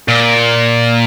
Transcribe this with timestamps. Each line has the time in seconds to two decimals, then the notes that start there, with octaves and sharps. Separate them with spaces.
0.08 A#2